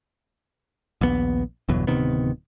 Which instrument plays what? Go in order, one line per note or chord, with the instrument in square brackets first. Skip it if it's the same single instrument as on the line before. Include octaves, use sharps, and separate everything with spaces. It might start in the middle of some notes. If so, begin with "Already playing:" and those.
[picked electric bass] A#1 D#2 B3
G1 E2 B2 F#3
D1 C3 D#3 B3